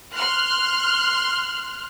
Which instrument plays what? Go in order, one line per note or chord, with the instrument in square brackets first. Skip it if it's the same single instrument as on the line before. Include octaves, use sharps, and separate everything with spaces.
[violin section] C6 F6 F#6